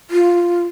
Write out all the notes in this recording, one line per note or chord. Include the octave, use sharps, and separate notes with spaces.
F4